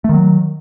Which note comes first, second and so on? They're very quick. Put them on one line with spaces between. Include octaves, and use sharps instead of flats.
A3 D#3 F#3